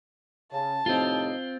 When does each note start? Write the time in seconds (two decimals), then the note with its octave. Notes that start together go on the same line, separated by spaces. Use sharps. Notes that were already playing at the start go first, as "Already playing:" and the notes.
0.51 C#3 A5
0.86 A2 C3 C4 D#4 F4